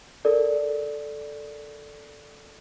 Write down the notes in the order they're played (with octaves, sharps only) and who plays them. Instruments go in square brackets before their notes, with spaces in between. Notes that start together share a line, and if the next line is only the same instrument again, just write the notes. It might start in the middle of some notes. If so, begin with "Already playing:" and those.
[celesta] A4 A#4 D5